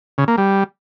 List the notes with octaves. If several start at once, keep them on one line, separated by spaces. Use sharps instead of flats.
C#3
A#3
G3